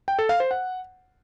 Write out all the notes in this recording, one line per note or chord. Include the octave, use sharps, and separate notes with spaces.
G5
A4
F5
C5
F#5